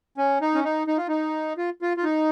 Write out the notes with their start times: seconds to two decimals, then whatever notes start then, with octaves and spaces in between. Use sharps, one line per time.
0.18 C#4
0.42 D#4
0.55 C#4
0.64 D#4
0.87 D#4
0.97 F4
1.08 D#4
1.57 F4
1.82 F4
1.97 F4
2.04 D#4